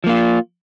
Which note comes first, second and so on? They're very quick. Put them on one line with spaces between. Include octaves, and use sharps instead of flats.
F3 A#3 F4